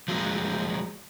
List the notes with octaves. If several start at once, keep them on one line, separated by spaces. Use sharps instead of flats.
F3 F#3 G#3 A#3 F#4